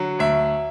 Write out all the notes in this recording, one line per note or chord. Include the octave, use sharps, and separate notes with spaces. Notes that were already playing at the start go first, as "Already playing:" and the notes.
Already playing: D3 F#3
D2 E5